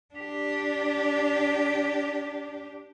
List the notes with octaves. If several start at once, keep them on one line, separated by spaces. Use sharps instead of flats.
D4 G4